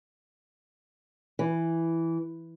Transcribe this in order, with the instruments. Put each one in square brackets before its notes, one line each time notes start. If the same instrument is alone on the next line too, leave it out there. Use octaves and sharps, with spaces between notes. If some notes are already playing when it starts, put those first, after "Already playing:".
[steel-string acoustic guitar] E3